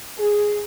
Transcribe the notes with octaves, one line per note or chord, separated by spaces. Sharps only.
G#4